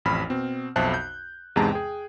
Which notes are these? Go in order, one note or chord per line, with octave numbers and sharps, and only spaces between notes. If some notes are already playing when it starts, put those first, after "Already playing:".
A1 F2 B5 F6
B2 C4
B1 F2 C5 E5 A5 F#6
G6
E2 G#2 C3 G#3 A5 A#5
G#4 G5